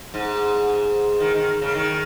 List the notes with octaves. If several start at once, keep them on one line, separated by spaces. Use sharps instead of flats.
G#2
D#3
D#3
C#3
D#3